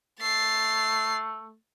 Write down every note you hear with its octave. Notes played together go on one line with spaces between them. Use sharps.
A3 A6 C7